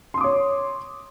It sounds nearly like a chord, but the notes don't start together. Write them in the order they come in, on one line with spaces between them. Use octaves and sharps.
C6 D#6 D6 C#5